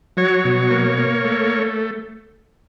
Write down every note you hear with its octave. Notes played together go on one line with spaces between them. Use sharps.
F#3 C#5
B2
A#3
A#3
A3